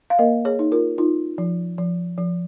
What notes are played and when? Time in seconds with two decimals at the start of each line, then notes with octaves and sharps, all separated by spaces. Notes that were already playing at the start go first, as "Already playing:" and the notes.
0.10 F5
0.19 A#3 A#4 D#5
0.45 G#4 C#5
0.59 D#4
0.72 F4 A#4
0.98 D#4 F4
1.38 F3
1.78 F3
2.18 F3